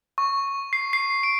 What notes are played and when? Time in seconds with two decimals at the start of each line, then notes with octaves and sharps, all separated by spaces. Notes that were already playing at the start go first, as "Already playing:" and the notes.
0.18 C#6
0.73 C7
0.93 C7
1.23 D7